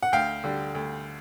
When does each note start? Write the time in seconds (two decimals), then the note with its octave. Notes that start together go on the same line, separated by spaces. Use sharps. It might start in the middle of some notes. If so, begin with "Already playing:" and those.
0.02 F#5
0.12 D2 F5 G5
0.44 D3 G3
0.75 D2